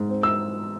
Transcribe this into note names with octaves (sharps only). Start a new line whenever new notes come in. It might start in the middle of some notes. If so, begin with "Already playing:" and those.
Already playing: G#2
C4
E6